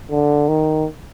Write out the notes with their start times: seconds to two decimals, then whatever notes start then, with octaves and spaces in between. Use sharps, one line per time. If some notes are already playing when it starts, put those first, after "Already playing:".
0.11 D3
0.48 D#3